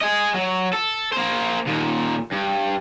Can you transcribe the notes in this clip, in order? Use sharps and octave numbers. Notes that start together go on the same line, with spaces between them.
D#5 G#5
F#3
A4
A#3 C5
D#2 A#2
G2